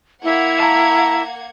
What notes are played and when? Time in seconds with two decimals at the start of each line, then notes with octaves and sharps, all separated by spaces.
0.24 A#3 E4 F#5 G#6
0.60 A5 A#5